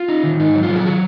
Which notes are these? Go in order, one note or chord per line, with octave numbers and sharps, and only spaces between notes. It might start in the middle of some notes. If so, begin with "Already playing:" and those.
Already playing: F4
D#4
D#3
G#2 D#4
F#3
F4
F#3
G#4
D#3 F#4